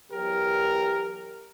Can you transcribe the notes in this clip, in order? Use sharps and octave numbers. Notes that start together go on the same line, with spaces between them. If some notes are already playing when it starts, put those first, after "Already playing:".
E2 F#3 G4 A#4